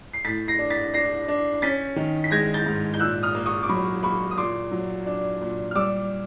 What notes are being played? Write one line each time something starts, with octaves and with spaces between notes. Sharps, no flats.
C7
A2 A6 B6
A#6 C7
D4
A6 B6
D4 A#6 C7
D4
C#4 A6 B6
D#3
B6
G#3 G#6 A#6
G6 A6
G#2
G6
A#2 E6 F#6
D#6 F6
A#3
C#6 D#6
D6
F#3 B5 C#6
A#3 B5 C#6
D#6
A#2 C6 D6
F#3
D4
A#2
F6
G3 D6 E6